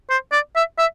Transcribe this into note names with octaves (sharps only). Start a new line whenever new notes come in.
C5
D5
E5
E5